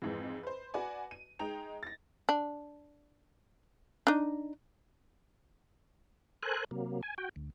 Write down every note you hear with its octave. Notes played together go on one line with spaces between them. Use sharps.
F2 G#2 E3
B4 C5
F#4 B4 D5 G#5
D#7
G#3 D#4 G5 A#5 F7
A6 A#6
D4
D4 D#4
A4 A#4 C5 G#5 F#6
C3 F#3 A#3
G#5
F#4 G5
D2